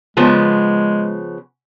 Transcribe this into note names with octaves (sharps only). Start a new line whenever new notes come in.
C#3 F3 G#3 B3